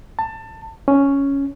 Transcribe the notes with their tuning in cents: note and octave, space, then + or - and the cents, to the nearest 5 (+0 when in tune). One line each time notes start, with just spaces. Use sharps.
A5 +20
C#4 +5